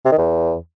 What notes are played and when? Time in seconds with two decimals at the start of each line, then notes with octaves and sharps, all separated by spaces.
0.05 C3
0.12 D#3
0.18 E2